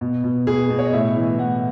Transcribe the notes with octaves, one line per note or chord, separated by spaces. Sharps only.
B2
B2
B2 G#4
B2
C#5
D#5
A2 E5
E3
A2 F#5